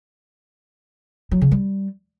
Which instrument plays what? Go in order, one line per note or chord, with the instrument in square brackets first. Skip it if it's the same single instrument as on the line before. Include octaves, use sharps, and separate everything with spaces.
[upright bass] F#3
C#3
G3